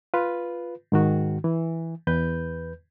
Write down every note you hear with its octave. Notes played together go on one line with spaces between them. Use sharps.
F4 B4
G#2 D#3 F#4
E3
E2 B4 G6